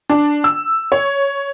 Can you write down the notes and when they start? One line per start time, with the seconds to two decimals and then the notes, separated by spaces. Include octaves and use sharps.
0.10 D4
0.44 E6
0.92 C#5